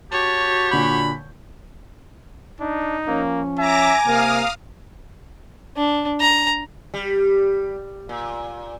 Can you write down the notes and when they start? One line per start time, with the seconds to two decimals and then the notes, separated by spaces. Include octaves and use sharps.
0.12 F#4 G4 C#5 A5
0.71 A#2 D3 B5 G6
2.60 D4 D#4
3.07 F3 A#3 C#4
3.59 E5 G#5 A#5 D6 A#6
4.06 C3 A#3 A#4 F5 D#6 F6
5.77 D4
6.21 A#5
6.94 G3
8.09 A#2